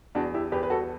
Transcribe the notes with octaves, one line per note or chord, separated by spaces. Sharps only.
E2 D4 F#4
E4 G4
E2 G4 B4
B4
F#4 A4